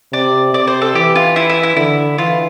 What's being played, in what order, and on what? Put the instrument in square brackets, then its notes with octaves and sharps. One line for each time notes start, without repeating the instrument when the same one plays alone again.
[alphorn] C3 [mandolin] D5
[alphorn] C3 [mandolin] D5
[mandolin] C5
A4
[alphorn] E3 [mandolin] G4
[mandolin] F4
E4
E4
E4
[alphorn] D3 [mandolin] E4
[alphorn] E3 [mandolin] F4